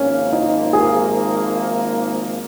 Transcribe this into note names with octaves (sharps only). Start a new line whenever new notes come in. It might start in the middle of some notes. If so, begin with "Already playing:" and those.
Already playing: G#1 G#2 F3 A#3 C#4
D#4
G#4